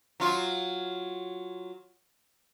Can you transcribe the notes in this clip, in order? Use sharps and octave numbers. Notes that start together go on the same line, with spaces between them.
F#3 F4